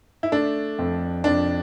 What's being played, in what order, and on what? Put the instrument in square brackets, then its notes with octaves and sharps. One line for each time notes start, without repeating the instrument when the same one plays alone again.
[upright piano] E4
[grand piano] A3 [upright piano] D4
[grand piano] F2
[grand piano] F2 [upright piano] D4